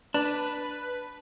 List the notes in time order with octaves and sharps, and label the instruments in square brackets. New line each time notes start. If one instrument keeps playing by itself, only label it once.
[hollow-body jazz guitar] D4 [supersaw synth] B4